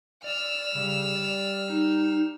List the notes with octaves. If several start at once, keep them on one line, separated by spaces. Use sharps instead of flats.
D5 E6 F6
C#3 G3
D5
D#4